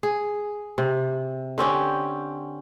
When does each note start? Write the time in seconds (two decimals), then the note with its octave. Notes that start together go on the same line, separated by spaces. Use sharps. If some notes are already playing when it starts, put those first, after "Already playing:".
0.03 G#4
0.78 C3
1.58 D3 C4 C#4 G4